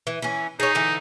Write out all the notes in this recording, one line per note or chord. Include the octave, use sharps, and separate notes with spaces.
E3
E3 C#4
D#4 G#4 C#5
D3 E3